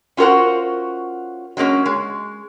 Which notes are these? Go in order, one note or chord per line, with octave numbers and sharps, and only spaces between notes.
C#4 F4 F#4 A#4 C5 F#5
F#3 G#3 A#3 C#4
G#3